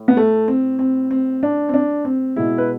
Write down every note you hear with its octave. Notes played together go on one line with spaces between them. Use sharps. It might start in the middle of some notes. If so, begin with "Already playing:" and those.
Already playing: A2
B3
A3
C4
C4
C4
D4
C4
D4
C4
B2 G#3 E4
B4